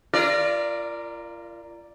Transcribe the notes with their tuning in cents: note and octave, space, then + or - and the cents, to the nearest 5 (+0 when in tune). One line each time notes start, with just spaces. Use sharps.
F4 -35 A#4 +0 D5 +0